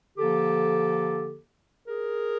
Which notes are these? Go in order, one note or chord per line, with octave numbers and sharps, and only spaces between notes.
D3 F3 A#3 G4 A4
G#4 A#4